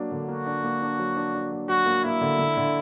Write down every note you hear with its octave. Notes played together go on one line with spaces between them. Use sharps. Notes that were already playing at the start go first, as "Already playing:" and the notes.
Already playing: F#3 A#3 D4
D3
A#3 F#4
D4
A#3
D4
F#3
D4
D4
F#3
F#3 F#4
A#3
A#3 E4
D3
D3
D3